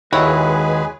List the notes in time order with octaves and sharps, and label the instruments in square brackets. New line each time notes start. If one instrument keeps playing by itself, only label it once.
[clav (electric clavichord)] D#2 [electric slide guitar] D#3 F#4 [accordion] G#3 G#4 B4 [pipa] E4 C#5